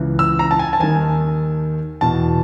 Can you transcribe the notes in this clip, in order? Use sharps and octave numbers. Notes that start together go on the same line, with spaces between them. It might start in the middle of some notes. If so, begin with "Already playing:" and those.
Already playing: C#2 C#3 E3
E6
A#5
A5
G#5
A5
D#2 D#3 G#5
E2 B2 A5